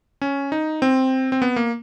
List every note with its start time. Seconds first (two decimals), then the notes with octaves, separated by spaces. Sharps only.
0.22 C#4
0.52 D#4
0.82 C4
1.32 C4
1.42 B3
1.56 A#3